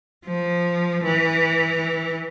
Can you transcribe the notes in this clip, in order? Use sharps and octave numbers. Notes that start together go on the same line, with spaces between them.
F3
E3